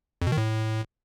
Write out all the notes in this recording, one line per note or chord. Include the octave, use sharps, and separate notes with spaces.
F2
B2
D#3
A2